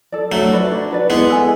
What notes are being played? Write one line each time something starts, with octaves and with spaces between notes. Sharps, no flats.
A4 D5
F#3 A3 D4
F#4 B4 D5
D4
F#4 B4 D5
G#3 B3 E4
A4 E5 G#5